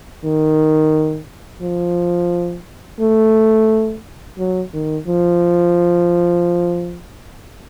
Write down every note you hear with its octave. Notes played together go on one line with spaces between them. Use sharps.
D#3
F3
A3
F#3
D#3
F3